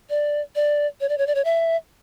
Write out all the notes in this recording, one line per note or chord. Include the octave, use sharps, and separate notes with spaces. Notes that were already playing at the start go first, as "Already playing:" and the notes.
D5
D5
C#5
D5
C#5
D5
C#5
E5